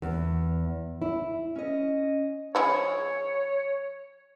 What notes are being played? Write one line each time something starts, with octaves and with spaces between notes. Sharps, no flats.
E2
E4
C#4 D#5
F3 E4 G#4 C#5